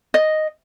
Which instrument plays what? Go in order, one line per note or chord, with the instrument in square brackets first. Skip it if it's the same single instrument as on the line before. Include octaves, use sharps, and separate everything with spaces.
[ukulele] D#5